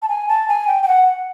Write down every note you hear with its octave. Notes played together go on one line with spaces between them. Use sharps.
A5
G#5
A5
G#5
G5
G5
F#5